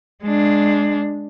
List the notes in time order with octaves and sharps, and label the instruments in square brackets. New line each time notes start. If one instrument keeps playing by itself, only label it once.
[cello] G#3 D4